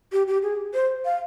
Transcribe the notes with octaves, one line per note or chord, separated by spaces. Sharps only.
G4
G4
G#4
C5
F5